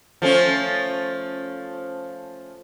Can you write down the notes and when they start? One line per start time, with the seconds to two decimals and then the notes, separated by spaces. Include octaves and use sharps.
0.22 F3 A3 C#4